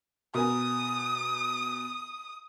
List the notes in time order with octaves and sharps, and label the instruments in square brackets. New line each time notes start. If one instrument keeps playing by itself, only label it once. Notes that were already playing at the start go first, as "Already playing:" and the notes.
[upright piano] B2 A#4 G#5 [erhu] D#6